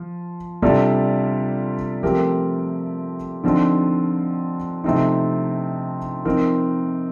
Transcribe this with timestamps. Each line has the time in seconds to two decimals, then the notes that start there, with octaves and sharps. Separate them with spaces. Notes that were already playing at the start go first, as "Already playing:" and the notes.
Already playing: F3
0.62 C3 G3 D4 F4 A4
2.03 F3 A3 C4 G4 A#4
3.44 D3 F3 C4 D#4
4.84 C3 F3 A3 C4 D#4
6.25 F3 C4 D#4 A#4